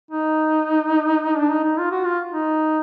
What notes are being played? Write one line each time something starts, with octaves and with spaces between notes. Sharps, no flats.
D#4
D4
D#4
D#4
F4
F#4
F4
D#4